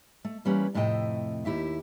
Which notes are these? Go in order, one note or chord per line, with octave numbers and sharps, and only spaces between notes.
A3
E3 G3 A#3 C#4 B4
F2 A2 C3 A3 D#5 G5
D#2 E4 G4 E5